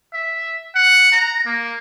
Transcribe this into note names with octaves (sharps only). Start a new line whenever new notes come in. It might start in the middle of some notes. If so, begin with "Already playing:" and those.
E5
F#5
A#5
A#3